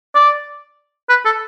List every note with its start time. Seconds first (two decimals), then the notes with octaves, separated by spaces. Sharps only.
0.15 D5
1.09 B4
1.25 A4